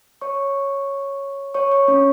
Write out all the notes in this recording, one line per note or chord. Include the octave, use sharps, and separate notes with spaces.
C#5 C#6
C#5 C#6
C#5 C#6
C#4 C#5